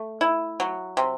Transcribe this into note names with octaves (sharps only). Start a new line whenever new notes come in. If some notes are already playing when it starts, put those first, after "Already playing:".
Already playing: A3
E4
F#3
C3